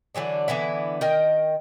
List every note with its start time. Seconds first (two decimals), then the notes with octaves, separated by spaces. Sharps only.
0.15 D3 E3 F#3 D4
0.48 D3 E3 B3 E4
1.01 D#3 A#4 D#5 G5